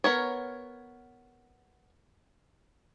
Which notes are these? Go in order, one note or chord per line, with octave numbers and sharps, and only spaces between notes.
B3 A#4 C#5